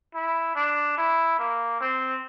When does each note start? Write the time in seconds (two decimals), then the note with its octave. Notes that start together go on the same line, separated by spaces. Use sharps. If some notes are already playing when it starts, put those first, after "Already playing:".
0.15 E4
0.56 D4
0.98 E4
1.39 A#3
1.81 C4